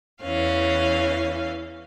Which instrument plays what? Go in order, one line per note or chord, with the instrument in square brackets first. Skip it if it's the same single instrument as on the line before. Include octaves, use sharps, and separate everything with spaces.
[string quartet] E2 E3 C#4 F5